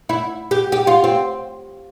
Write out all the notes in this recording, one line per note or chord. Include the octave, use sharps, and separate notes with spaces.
E4
G4
G4
F4
C4